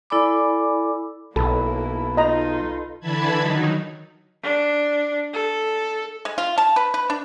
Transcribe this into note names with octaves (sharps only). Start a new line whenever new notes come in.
E4 A4 D5 G#5 B5 D6
B1 A#3 E4 A4 B4
D#4 F4 D#5 A#5
D3 E3 A5 B5 G#6
D#3 F#3 D#4
D4
A4
G#3
F4
A5
B4
B4
D4